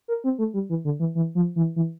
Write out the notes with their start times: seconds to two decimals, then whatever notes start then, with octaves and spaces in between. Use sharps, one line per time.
0.08 A#4
0.24 C4
0.38 A3
0.54 G3
0.69 E3
0.85 D3
1.00 E3
1.15 E3
1.35 F3
1.56 E3
1.76 E3